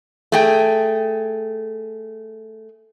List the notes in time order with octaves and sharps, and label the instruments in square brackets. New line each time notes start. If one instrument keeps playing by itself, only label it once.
[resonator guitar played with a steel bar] A3 G#4 G5